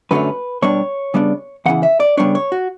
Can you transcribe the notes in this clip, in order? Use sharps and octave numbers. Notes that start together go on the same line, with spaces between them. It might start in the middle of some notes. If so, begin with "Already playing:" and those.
F#2 D3 F#3 A3 C#4 B4
B2 G3 B3 D4 C#5
C#3 G3 B3 D4
E2 C#3 E3 F#5
E5
D5
C#3 G3 B3 D4 C#5
C#5
F#4